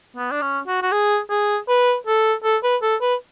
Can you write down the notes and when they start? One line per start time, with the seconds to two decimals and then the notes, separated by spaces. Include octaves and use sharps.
0.17 B3
0.31 D4
0.42 C#4
0.67 F#4
0.83 F#4
0.92 G#4
1.30 G#4
1.68 B4
2.07 A4
2.44 A4
2.63 B4
2.82 A4
3.01 B4